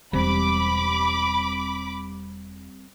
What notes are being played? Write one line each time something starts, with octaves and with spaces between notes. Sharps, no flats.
E1 G3 C4 B5 D6